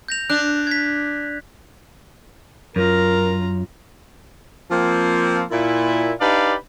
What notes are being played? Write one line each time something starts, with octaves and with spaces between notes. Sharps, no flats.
G6 A#6 F7
D4 F#6
G#6 B6
F#2 F4 A#4 A#5
F3 A#3 C4
A#2 E4
D4 D#4 G4 B4 D5 F5